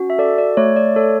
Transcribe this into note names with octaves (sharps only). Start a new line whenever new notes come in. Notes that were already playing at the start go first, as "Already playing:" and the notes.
Already playing: C#4 F#4
E5
A4 D5
D5
A3 C#5
D5
A4 C#5